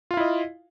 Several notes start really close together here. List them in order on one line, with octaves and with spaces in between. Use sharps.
F4 F5 E4 D#5